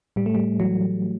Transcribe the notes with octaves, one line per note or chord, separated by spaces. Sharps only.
A2 G3
A3
G3
E3 F#3